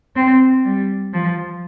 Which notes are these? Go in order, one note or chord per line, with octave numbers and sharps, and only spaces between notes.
C4
G3
F3